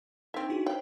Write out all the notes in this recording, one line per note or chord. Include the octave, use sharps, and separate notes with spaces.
C4 D4 D#4 E5
E4 F#4 G#4
C5 C#5 E5 G5